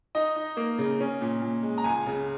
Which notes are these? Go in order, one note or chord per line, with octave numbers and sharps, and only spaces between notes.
D#4 D#5
D#4
A#3
C#3
C#4
A#2
A#2
G#3
A#5
C#2 G#5
C#3